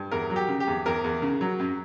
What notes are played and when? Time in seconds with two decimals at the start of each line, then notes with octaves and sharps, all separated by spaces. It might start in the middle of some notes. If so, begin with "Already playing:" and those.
Already playing: G2
0.11 E2 A#4
0.30 F#3
0.36 G4
0.48 C#3
0.60 G4
0.67 E2
0.86 E2 A#4
1.04 E2
1.22 C#3
1.41 F#3
1.59 F#2